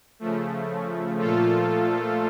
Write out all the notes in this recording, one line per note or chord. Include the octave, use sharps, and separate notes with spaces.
C#3 F3 A3
A#2 F3 A3 F4 A4